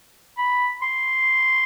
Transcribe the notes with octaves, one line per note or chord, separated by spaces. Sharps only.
B5
C6